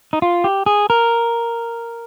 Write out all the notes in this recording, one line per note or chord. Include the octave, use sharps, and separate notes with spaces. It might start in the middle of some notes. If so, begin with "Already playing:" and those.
D#4
F4
G4
G#4
A#4